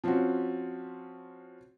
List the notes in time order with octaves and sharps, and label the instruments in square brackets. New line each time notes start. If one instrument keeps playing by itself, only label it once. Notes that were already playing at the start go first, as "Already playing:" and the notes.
[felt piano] F3 C4 C#4 F4 F#4